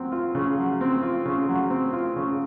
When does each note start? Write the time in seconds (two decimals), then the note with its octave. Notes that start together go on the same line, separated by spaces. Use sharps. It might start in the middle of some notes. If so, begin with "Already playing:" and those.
Already playing: F#3 C4
0.12 F4
0.35 C#3
0.58 F#3
0.81 C4
1.02 F4
1.25 C#3
1.49 F#3
1.70 C4
1.93 F4
2.16 C#3